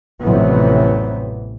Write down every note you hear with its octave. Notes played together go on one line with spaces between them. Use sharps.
A1 F2 C3 E3 F#3 B3